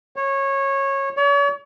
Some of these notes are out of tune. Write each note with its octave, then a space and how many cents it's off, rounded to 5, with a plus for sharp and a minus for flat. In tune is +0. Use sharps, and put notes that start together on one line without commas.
C#5 -20
C#5 +40